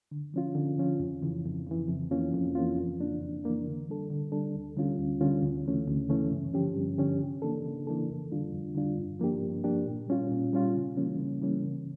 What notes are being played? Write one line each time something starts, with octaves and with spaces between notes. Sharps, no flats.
D3
F3 C#4 F4
D3
F3 C#4 F4
F2
C#3 E3
F2
C#3 E3
F2
E3 A#3 C#4 F4
F2
E3 A#3 C#4 F4
F2
C#3 E3 A#3 D4
F2
C#3 E3 A#3 D4
D3
G3 D4 A4
D3
G3 D4 A4
D2
D3 G3 C#4 F4
D2
D3 G3 C#4 F4
D2
C#3 E3 A3 C#4
D2
C#3 E3 A3 C#4
G2
D3 F3 C#4 G4
G2
D3 F3 C#4 G4
C#3
E3 A#3 D4 A4
C#3
E3 A#3 D4 A4
F2
D3 G3 D4 F4
F2
D3 G3 D4 F4
G2
F3 A#3 D4 G4
G2
F3 A#3 D4 G4
A#2
G3 C#4 F4
A#2
G3 C#4 F4
C#3
E3 G3 A#3 C#4
C#3
E3 G3 A#3 C#4
C#3